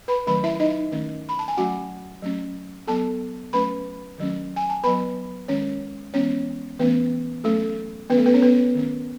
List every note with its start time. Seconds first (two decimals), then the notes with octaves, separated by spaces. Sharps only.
0.08 B4 B5
0.27 D#3 F#3 A3 C#4 B4 B5
0.44 E4 E5
0.60 D#4 D#5
0.92 D#3 A3 C#4
1.29 B5
1.39 A5
1.48 G#5
1.57 F#3 A3 C#4 F#4 F#5
2.22 F#3 A3 C#4
2.87 F#3 B3 A4 A5
3.53 F#3 A3 C#4 B4 B5
4.18 D#3 F#3 A3 C#4
4.56 G#5
4.70 A5
4.84 F#3 B3 B4 B5
5.48 D#3 G#3 C#4 C#5
6.14 E3 G#3 B3 C#4 C#5
6.79 E3 A3 B3 C#4 B4
7.44 F#3 A3 C#4 A4
8.09 D#3 F#3 B3 C#4 B4
8.17 A3 A4
8.26 B3 B4
8.34 C#4 C#5
8.42 B3 B4
8.75 D#3 A3 C#4